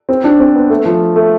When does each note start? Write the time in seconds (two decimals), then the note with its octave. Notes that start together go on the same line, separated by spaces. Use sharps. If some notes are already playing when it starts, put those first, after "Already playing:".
0.09 C4
0.24 D4
0.39 C4
0.55 B3
0.70 A3
0.86 F3
1.16 A3